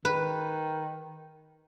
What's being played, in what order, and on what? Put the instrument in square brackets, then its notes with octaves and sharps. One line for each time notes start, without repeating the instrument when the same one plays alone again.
[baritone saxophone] D#3 [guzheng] B4